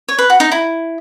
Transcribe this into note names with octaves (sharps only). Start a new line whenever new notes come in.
C#5
B4
F#4
D#4
E4